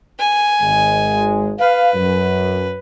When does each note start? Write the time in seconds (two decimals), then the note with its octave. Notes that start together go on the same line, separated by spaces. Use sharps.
0.20 G#5
0.62 G#1 G#3
1.59 B4 F5
1.95 F#2